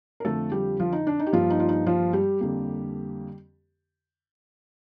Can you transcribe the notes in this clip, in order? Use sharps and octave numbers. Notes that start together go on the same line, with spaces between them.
A#4
F2 D3 F3 A3 A4
G3 G4
F3 F4
D#4
D4
D#4
G4
G2 F3 A#3 F4
D#4
F4
D#4
F3 F4
G3 G4
F2 D3 G3 A#3